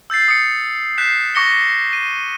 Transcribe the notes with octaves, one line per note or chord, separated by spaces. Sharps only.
E6 G6 A6 C7
D#6 C#7
F#6 G6 B6 C7 E7
C#6 D6 A#6 C#7 G7
D#7